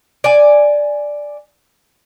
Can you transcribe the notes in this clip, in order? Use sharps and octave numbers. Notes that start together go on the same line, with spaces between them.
D5 G#5